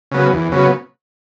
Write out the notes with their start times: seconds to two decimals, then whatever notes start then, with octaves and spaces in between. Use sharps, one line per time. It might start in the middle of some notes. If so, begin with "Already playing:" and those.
0.12 C#3 F#3 B3
0.32 E2
0.51 C#3 F#3 B3